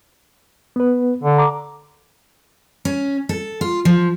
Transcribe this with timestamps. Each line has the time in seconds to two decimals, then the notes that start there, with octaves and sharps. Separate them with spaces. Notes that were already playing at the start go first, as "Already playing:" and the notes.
0.76 B3 B4
1.23 D3
1.38 A#5 D6
2.85 C#4
3.29 A4
3.61 F4
3.85 F3